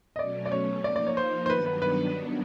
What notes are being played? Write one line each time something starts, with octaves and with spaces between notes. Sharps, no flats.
D#5
B2 F#3 A3 C#4 D5
D5
C#5
F3 A#3 D#4 D5
D5
C#5
C5
C5
G2 D#3 F#3 B3 D4 B4
B4
B4